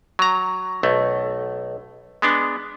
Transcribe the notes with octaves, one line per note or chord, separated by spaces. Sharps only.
F#3 A#5
B1 A3
G#3 B3 D4